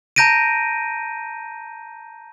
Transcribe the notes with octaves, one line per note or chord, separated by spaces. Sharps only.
A5 A#5 G6 A#6 D7 D#7